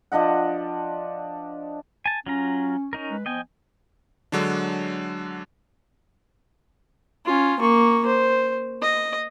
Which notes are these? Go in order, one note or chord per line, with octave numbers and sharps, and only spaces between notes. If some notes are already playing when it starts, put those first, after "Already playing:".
F3 D4 D#5 F#5
G#5 A5
F#3 C#4 F4 A#5
C#4 D#4 A#4
G#3 B4
F3 B3 D#5 G5 G#5
D3 F#3 G#3 D4
C#4 F4
A#3 C#6
C5
D#5